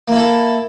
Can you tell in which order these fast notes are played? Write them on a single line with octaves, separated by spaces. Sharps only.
A#3 E4 A4